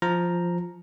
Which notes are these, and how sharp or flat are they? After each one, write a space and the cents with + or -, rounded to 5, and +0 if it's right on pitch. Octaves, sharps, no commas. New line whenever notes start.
F3 +0 A#5 +0